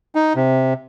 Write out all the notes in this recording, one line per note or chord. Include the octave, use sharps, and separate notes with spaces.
D#4
C3